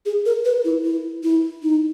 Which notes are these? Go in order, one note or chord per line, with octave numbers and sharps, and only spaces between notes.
G#4
A#4
B4
E4
E4
E4
D#4